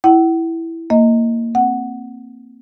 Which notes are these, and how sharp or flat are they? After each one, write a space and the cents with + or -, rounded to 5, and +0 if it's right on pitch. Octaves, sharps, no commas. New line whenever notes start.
E4 +0 F#5 +40
A#3 -15 D#5 +15
C4 +0 F#5 +0